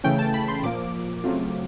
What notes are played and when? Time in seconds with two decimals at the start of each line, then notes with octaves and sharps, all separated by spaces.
0.04 C#3 E3 A3 C#4 G5
0.19 A5
0.34 B5
0.48 C6
0.63 A#2 F3 A#3 D6
1.24 C#3 F#3 A3 C4 F4